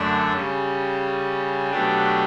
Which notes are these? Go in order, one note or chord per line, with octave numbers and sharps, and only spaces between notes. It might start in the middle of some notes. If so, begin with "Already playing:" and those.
Already playing: F#2 D3 A3 D4 A4
C#3 G3 C#4
B2 F#3 A3 D4 G4